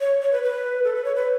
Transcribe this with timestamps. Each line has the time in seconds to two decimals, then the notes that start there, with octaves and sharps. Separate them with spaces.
0.01 C#5
0.22 C#5
0.32 B4
0.43 B4
0.84 A4
0.95 B4
1.04 C#5
1.15 B4